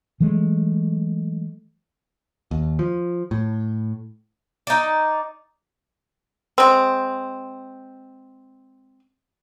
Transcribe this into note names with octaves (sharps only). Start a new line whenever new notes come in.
E3 F#3 G#3 A3
D#2
F3
A2
D#4 D5
G#3 C4